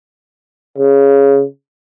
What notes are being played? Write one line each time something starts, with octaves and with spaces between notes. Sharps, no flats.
C#3